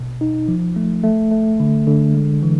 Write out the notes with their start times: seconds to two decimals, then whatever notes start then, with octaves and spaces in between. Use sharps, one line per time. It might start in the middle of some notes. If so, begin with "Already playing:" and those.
Already playing: B2
0.21 D#4
0.48 F3
0.76 A3
1.04 A3
1.31 A3
1.60 D3
1.87 D3
2.15 G#3
2.43 E3